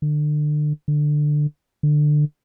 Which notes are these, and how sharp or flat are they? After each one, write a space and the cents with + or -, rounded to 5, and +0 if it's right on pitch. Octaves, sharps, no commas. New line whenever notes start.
D3 +30
D3 +15
D3 +20